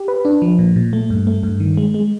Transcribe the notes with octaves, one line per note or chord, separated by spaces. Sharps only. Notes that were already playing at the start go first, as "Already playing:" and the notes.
Already playing: G4
B4
D4
F3
A#2
A#2
A3
G2
A3
G2
D#3
G#3
G#3